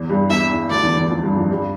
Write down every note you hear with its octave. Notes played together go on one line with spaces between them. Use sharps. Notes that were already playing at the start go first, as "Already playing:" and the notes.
Already playing: E2 E3
G2 G3
E2 E3 E5
E2 E3
D2 D3 D5
E2 E3
E2 E3
F2 F3
G2 G3
F2 F3
G2 G3